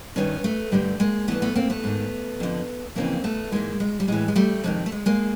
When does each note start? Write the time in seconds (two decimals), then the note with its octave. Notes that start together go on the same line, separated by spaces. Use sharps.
0.16 G2 D#3 B3 C#4
0.44 A3 B3
0.72 G2 D3 G3 A3
1.00 G#3 A#3
1.28 G2 E3 A3 B3
1.42 A3 B3
1.56 A#3 C4
1.70 A3 B3
1.84 G#2 D#3
2.40 F2 D3
2.95 F2 C#3 E3 A#3 C4
3.24 A3 B3
3.52 G#2 E3 G#3 A#3
3.80 G#3
4.00 G3
4.08 A2 E3 G#3
4.28 G#3
4.35 G3 A3
4.64 F2 C3 D#3 G#3
4.86 A3
4.92 G#3
5.06 G#3 A#3